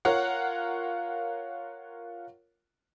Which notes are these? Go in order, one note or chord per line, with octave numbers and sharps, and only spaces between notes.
F4 A#4 C#5 F5 F#5